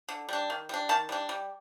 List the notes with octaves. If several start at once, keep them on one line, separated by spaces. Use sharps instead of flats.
D3
G3 D4
D#3
G3 D4
D#3 A5
G3 D4
G3